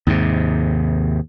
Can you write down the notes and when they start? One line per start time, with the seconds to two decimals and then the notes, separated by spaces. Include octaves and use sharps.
0.07 D#2 G#2 C3